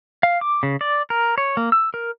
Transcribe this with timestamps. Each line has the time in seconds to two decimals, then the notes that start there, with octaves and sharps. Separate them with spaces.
0.23 F5
0.41 D6
0.63 C#3
0.81 D5
1.10 A#4
1.38 C#5
1.57 A#3
1.72 E6
1.94 A#4